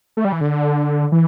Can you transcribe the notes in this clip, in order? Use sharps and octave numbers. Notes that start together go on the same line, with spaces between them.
A3
G3
E3
D3
E3